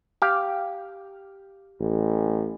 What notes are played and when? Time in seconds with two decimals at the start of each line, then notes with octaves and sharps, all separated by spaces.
0.22 G4 F5 G5
1.80 A1